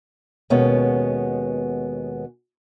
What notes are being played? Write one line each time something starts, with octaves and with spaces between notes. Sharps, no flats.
D#2 B2 G#3 B3 C#4